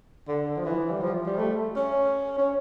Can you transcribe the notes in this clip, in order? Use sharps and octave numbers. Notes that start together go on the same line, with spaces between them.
D3
F3
E3
G3
F3
G3
A3
C#4
C#4